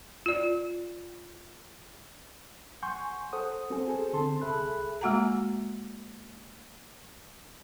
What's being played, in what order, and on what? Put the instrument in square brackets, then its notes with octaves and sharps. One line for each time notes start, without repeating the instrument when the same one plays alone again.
[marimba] F4 D5
[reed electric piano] F#5 G#5 C6 C#6 G6
A4 C5 F#5 D#6
C4 F#4 A4 C5 G#5
G#4 A4 C5
D3 C4 A4 A5 C6
C2 G#4 A4 E5 B5 F#6
[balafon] G#3 A#3 F#4 F#5 G#5 A#5